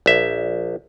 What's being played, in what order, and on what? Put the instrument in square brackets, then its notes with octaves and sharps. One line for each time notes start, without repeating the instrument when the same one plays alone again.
[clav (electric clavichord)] A#1 E5